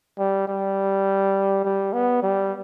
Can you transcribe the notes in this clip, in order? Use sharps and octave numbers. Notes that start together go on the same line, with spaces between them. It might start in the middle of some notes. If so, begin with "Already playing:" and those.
G3
G3
G3
B3
G3